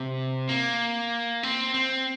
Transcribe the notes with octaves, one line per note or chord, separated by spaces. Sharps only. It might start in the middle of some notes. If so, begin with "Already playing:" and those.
Already playing: C3
A#3
C4
C4